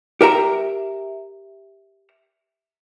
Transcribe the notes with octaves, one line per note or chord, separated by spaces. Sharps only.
G4 A#4 E5 A#5